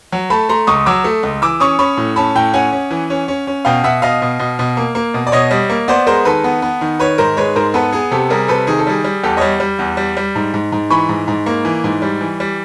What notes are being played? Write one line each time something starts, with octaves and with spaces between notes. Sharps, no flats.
F#3
A3 A5 B5
A3 A#5 C6
C#2 C#6 D#6
F#3 D6 E6
A3
C#2
E3 D6 E6
C#4 C#6 D#6
C#4 B5 C#6
A2
C#4 A5 B5
A2 G5 A5
C#4 F#5 G#5
C#4
E3
C#4
C#4
C#4
B2 F5 G5
B2 E5 F#5
B2 D#5 F5
B2
B2
B2
A#3
A#3
B2
D5
B2 C#5 D#5
G3
A#3
B3 C5 D5
G#3 A#4 C5
D#3 A4 B4
B3
B3
D#3
D#3 B4 C#5
G#2 A#4 C5
G#3 B4 C#5
G#2 A#4 C5
B3 A4 B4
B3 G#4
C3 G4 A4
G3 G#4 A#4
C3 A4 B4
D#3 G#4
A4
G3 G#4
G3
E2 G4 A4
G3 C#5 D#5
G3
E2
G3
G3
G#2
G#2
G#2
E3 B5 C#6
G#2
G#2
A#3
E3
G#2
G3
E3
G3